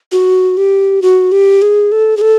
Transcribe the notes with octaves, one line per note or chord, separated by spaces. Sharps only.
F#4
G4
F#4
G4
G#4
A4
G#4
A4